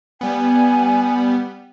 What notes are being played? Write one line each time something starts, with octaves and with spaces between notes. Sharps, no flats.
G3 B3 G#5